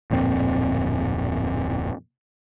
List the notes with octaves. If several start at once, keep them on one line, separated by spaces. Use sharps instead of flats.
D1 F2 A#2 C4